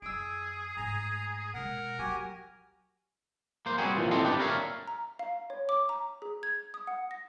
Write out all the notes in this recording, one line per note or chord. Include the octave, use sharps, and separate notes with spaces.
F#2 G#4 E6 D7
C7
G#2 A3 G#5 A#5
B2 G#3 A#4 F#5
F#3 F#4 G4 G#5
A#3 C5
G3 C4 C#4 F#4 G#4
A#2 E3 F3
C4 E4 G4 A4 D#5 C6
D4 G4 B4 D5
A#4 C#5 D5 E5 F5
A#5
F5
C#5
D6
A#5
G#4
G#6
D#6
F#5
A#6